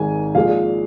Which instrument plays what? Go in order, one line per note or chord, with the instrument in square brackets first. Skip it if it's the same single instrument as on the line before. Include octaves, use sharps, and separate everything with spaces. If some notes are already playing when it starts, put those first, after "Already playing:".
Already playing: [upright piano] G#1 G#2 D#3 G#3 G#5
A#1 A#2 F3 G#3 F5